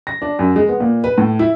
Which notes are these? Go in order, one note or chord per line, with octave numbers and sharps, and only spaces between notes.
A#6
D4
F#2
G#3
B3
A#2
B4
A2
E4